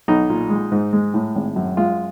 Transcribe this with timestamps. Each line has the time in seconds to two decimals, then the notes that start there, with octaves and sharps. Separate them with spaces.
0.08 B1 D#4
0.29 A#2
0.50 G#3
0.72 G#2
0.93 G#3
1.14 A2
1.35 G#1
1.56 F#2
1.77 G#3 F4